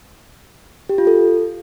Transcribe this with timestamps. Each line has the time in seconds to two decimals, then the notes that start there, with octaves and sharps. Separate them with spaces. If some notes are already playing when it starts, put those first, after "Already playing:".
0.89 G4
0.98 F4
1.07 A4